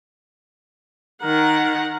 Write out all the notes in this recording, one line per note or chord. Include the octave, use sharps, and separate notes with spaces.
D#3 A#4 F#5